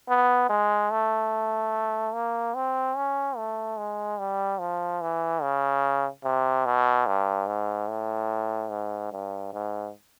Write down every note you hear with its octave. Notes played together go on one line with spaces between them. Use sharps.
B3
G#3
A3
A#3
C4
C#4
A3
G#3
G3
F3
E3
C#3
C3
B2
G2
G#2
A2
G#2
G2
G#2